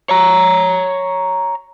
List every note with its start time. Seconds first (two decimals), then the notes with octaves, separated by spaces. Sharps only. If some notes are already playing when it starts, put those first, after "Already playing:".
0.09 C#5 A#5